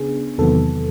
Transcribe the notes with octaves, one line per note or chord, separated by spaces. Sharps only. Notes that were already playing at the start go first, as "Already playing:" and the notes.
Already playing: C#3 B3 D4 G#4
E2 C3 D#3 F#3 B3 A4